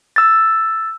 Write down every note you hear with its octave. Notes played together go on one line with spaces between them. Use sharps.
E6 A6